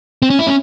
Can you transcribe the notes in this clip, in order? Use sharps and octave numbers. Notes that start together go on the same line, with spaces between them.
C4
C#4
E4
C#4